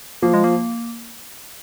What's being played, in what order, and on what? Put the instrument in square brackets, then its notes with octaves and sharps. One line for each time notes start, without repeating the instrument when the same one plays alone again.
[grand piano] F3 [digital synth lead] A#3
[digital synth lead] G#3
A#3